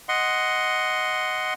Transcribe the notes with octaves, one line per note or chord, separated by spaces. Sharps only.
D#5 F#5 C6